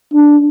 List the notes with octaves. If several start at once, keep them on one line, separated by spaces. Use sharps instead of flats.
D4